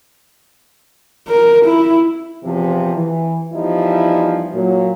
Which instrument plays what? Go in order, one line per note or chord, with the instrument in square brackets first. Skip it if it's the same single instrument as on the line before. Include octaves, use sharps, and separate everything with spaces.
[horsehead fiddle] A#4
E4
[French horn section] E2 C3 F3
E3
E2 F3 G3 D#4 E4
A#2 F#3